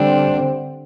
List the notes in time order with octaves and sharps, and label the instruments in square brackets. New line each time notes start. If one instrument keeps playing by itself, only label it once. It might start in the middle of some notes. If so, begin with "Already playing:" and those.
Already playing: [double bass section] D3 G3 C4 [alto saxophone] D4